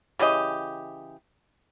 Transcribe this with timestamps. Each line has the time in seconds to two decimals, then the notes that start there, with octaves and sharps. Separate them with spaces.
0.19 C#3 E3 G4 D#5